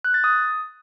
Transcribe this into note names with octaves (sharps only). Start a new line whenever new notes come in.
F#6
A6
D#6